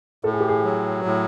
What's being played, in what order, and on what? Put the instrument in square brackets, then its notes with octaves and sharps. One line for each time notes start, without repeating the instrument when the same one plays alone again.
[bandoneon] A2 [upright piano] A4
[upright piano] G#4
G4
G#4
[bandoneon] F#3
A2